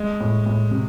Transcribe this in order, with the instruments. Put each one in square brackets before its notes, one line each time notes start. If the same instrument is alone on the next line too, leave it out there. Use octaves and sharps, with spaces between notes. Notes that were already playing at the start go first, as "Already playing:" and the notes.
Already playing: [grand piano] G#3
[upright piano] A2
A2
C3